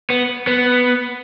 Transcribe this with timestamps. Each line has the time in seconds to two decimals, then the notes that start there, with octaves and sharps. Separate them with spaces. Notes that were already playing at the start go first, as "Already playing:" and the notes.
0.10 B3
0.47 B3